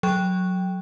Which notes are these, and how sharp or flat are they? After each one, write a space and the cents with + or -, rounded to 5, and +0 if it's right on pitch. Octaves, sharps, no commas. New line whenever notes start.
F#3 -10 A4 -35 G5 +0